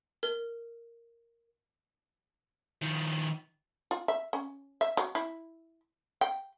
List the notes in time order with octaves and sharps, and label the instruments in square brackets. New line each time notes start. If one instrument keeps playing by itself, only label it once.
[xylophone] A#4
[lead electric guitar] D#3 F3
[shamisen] F4
E5
C#4
E5
F#3
E4
G5